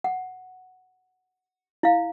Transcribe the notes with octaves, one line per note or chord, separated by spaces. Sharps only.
F#5
E4 F5